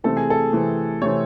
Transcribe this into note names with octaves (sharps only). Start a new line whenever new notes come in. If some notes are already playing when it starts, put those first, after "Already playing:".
C3 E3 A3 C4 A4
G#4
A4
C3 E3 A3 C4
C3 E3 A3 C4 C#5